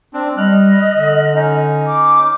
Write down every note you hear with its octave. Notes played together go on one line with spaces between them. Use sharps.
C4 D4
G3 D#5 F6 F#6
D3
C#4 D#4
D6